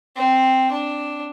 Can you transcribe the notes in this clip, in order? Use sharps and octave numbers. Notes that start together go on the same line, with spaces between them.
C4
D4